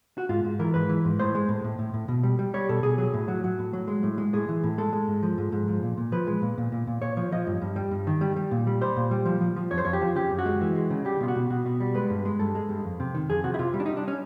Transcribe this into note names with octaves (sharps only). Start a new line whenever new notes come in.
F#4
G#2 F4
G#2
E3 A#4
G#2 B4
E3
G#2
A2 C5
G#3
A2
A2
A2
A2
B2
G3
G3
G3 C#5
B2 A4
B2 G#4
F#3 G#4
A2
F#3
F#3
A2
F#3
G#3
A2
G#3
A2 G#4
E3
A2
G#3 A4
G#3
G#2
F3
G#2
G#2
F3
A#2
A#2
F3 B4
G#3
A#2
A#2
A#2
A#2
A#2 C#5
F3 C#5
F3 D#5
G2
G2
G3
G2
D#3
G3
G3
A#2
G3
G3 C5
A#2
G3
F3
F3
F3
F2 C#5
C5
F2 C#5
G4
F3
C#3 G4
F#2
F#4
G#3
E3
G#3
C#3
G3 G4
B2 F4
F#4
B2
B2 F#4
B2
G3
G#3 B4
G2
G#3
G2 A4
G#3
G2
F2
C3
D#3
F2 G#4
C3 F#4
E4
C3 F4
G3
D4
D#4
G3
D4
C#4